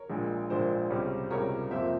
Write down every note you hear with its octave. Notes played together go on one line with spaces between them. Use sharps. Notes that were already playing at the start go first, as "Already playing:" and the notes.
Already playing: A#4 C#5
A#1 A#2 G#3
A#1 A#2 G#3 C5
C#2 C3 G3 C#4
C#2 C3 G3 C#4 A#4 C#5
F2 C3 F3 A#3 C5 E5